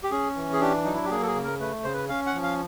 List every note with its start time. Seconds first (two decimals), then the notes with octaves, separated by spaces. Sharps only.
0.03 G4
0.11 C#4 G#4
0.36 E3
0.53 G#4
0.61 D4 G4
0.84 F#3 D#4
0.94 E4
1.05 G4
1.10 A#3 G#4
1.23 A4
1.27 G#4
1.35 C#3
1.44 A#4
1.60 A3 B4
1.84 C#3 C5
1.93 B4
2.09 C#4 F5
2.26 F#5
2.35 F3
2.43 F5